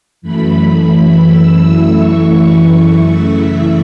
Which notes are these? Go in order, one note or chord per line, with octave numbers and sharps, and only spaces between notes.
F#2 E3 A3 B5
B5
E6
F#2 E3 A3 E4 E6
C#6
F#2 C#3 E3 A3 E4 E5